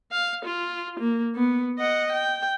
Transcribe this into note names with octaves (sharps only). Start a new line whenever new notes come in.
F5
F4
A#3
B3
D#5 F#5
G5